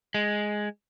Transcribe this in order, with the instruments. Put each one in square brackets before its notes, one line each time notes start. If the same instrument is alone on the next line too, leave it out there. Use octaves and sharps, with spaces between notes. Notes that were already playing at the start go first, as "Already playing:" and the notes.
[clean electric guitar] G#3